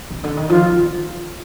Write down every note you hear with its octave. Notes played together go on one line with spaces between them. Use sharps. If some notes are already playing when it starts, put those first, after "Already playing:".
C3
D3
D#3
F3 F4
D#3